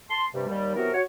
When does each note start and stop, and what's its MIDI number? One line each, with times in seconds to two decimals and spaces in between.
0.10 0.26 81
0.10 0.26 84
0.34 0.46 43
0.34 0.46 48
0.34 0.46 55
0.48 0.73 39
0.48 0.73 55
0.76 0.91 48
0.76 0.91 52
0.76 0.91 54
0.76 0.91 59
0.76 0.91 66
0.76 0.91 70
0.94 1.02 66
0.94 1.02 73